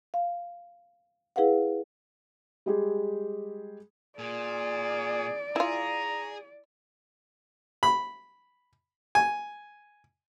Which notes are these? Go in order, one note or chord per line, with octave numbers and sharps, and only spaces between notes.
F5
E4 G#4 B4 F5 F#5
G3 G#3 G4 G#4
A#2 G#4 D5
E4 F4 G#4 A#5
B5
G#5